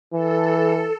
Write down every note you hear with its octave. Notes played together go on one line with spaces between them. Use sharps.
E3 A4